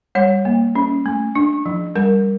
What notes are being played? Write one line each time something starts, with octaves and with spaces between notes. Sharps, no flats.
G3 C#5
A#3
C#4
A3
D4
F3
G3 A#4